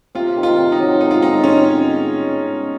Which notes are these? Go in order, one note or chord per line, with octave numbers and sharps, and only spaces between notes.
C3 F4
D#3
F4
C3
D#4
F#3
G#3 D#4
F4
C4 D#4
G#3 C#4